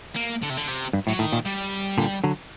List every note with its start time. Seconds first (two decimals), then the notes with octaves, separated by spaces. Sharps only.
0.15 A#3
0.42 D3
0.49 C3
0.57 D3
0.68 C3
0.93 G2
1.07 A2 F#3
1.19 A2 D#3
1.32 A#2
1.45 G3
1.98 A#2 D3
2.24 D3 F#3